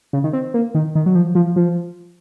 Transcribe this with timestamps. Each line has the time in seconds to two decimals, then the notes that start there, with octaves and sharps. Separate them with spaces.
0.13 C#3
0.24 D#3
0.33 C4
0.54 A#3
0.75 D#3
0.95 D#3
1.06 F#3
1.15 F3
1.35 F3
1.56 F3